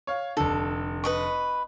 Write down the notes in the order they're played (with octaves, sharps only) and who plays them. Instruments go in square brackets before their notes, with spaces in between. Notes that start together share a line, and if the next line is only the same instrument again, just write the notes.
[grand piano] C#5 F5
[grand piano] F1 D3 [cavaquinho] A4
[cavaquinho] B4 D#5 C#6